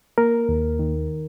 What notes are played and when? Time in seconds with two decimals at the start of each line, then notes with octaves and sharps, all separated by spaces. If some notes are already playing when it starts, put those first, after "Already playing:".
0.18 A#3 A#4
0.49 D#2
0.79 D#3